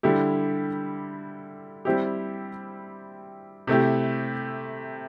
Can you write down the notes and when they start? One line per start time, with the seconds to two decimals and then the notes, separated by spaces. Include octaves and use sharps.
0.03 D3 G3 E4 G4
1.85 G3 C4 E4 G4
3.67 C3 A3 E4 G4